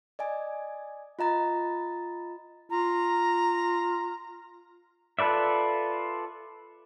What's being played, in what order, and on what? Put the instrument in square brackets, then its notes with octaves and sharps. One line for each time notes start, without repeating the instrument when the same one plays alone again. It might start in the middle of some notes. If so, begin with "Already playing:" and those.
[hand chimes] D5 D#5 G#5
F4 D#5 A#5 A6
[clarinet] F4 [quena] A#5
[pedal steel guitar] F4 A4 B4 D5 E5